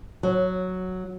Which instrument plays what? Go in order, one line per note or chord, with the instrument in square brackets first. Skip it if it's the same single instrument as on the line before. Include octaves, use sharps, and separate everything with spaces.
[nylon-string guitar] F#3